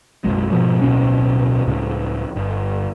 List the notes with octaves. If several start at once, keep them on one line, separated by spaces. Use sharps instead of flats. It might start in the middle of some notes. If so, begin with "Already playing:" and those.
F#1 B1 G#3
G#2 B2 F3
D1 B1 B2 C#4
C#2 A2 C#3
G1